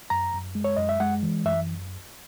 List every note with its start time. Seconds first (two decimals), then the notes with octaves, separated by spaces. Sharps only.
0.10 F#2 A#5
0.33 F#2
0.55 G#3
0.64 C#5
0.77 F#2 D#5
0.89 E5
1.00 G#3 F#5
1.23 E3
1.45 F#2 E5